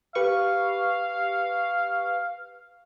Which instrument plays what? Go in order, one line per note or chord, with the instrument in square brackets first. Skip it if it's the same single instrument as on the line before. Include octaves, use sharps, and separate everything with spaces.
[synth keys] G4 B4 C#6 [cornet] F5